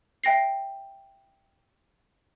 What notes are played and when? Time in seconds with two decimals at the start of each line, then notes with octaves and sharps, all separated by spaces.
0.24 E5 G5 A#6 C7